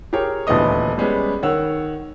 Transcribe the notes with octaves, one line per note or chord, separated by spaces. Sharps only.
G4 G#4 A#4 C#5
D#1 D2 E3 B3 D#5 D#6
G3 G#3 B3 C#4
D#3 C#5 F#5 E6